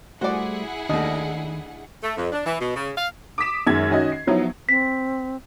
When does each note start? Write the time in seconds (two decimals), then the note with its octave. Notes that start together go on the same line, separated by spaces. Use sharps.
0.21 G3 A3 E4 F#4 G#4 C5 D5 F#5
0.89 D#2 D#3 A3 D4 D#5
2.03 A3
2.17 F2
2.32 D4
2.46 E3
2.60 B2
2.75 C#3
2.97 F5
3.38 D6 D#6 B6 E7
3.67 F#2 D#3 G#3 G#6
3.91 D#3 C#4 F#4 D#5
4.12 C7
4.27 F3 F#3 B3 D#4 E4
4.69 C4 B6